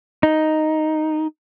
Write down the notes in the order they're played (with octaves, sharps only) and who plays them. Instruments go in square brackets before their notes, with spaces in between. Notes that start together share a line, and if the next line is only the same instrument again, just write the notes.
[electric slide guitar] D#4